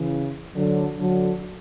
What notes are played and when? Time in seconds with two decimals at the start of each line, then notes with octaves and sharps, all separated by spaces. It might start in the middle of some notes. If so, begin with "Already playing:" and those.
Already playing: C#3 E3
0.55 D3 F#3
0.99 D3 F#3